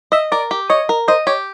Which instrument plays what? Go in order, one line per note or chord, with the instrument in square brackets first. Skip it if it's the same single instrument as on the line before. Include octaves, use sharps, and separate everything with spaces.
[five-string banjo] D#5 [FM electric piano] E5
[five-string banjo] A#4 [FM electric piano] D5
[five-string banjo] G4
[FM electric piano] C#5 [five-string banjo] D#5
[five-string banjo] A#4
[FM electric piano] C5 [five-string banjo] D#5
[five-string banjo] G4 [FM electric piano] C#5